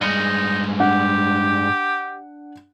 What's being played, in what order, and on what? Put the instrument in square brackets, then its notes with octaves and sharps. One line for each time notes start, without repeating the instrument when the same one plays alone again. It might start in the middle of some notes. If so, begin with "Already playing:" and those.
[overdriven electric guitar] G2 G#3 [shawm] D#4 [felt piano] C#7 D#7
[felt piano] D4 F#5 [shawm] G4